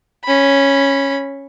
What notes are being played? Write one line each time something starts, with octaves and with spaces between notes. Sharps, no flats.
C#4 B5